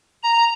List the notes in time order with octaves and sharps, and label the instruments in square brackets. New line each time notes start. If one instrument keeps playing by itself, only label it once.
[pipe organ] A#5